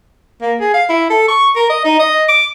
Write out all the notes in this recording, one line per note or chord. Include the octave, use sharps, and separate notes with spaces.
A#3
G#4
F5
E4
A4
C#6
A#4
D#5
D#4
D#5
D6